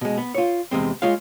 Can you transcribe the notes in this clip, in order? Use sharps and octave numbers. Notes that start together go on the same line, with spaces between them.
B2 G#3
B3
F4 C#5
E2 C3 G#3 C4
G#3 F4 C#5 F5